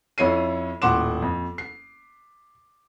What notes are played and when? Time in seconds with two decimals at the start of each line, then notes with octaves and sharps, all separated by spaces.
0.18 F2 E4 C#5 C7 D#7
0.82 D#1 A2 F#5 C6 D6 E7
1.22 F2
1.58 C7